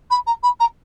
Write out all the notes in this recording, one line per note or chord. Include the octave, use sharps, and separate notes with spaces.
B5
A#5
B5
A#5